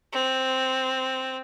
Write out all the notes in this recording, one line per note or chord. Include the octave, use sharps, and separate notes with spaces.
C4